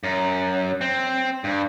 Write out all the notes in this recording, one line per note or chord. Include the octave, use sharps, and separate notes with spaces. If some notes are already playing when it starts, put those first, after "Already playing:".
F#2
C4
G2